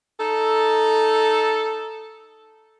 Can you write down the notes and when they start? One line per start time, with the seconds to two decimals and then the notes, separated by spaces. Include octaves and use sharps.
0.19 D#4 A4